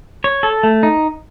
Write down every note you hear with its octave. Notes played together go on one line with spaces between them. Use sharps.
C#5
A4
A3
D#4